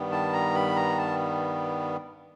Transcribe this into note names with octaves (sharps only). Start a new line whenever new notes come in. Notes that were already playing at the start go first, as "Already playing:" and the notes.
Already playing: G2 D#3 G3 B3
A5
A#5
B5
A#5
A5